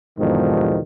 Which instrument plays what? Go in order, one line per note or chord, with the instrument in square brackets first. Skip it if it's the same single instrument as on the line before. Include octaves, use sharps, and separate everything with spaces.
[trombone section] E2 G#2 B2 D3 D#3 F3